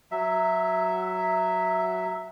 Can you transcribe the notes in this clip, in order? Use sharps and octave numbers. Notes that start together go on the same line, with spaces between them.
F#3 E5